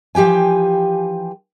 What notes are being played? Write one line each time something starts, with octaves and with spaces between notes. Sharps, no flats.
E3 F3 G4 G5 G#5